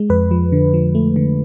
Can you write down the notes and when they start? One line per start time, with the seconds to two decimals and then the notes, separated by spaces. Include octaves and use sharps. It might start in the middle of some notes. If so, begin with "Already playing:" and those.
Already playing: G#3
0.10 F2 B4
0.31 F3
0.52 D3
0.74 F3
0.95 A3
1.16 D3